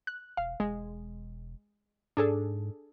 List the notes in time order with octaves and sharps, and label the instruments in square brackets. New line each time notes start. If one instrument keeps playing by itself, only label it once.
[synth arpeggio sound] F#6
[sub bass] E1 [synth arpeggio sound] F5
[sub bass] E1 [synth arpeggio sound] G#3
[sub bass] G#2 [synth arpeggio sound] D4 G#4 A4